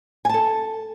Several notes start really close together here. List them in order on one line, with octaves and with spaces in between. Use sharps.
G#5 A5 A4